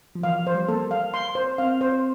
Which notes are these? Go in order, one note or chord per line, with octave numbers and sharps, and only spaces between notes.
F3
E3 F5
F3
C5
G3
A#3 A4
F5
C6
C5
C4 F5
C5